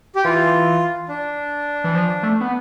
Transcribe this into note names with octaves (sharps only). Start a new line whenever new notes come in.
G4
E3 F4
D4
E3
F3
A3
B3